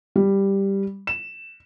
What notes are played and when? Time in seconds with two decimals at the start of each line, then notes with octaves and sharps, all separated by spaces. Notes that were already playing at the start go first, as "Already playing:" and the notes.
0.16 G3
1.07 E7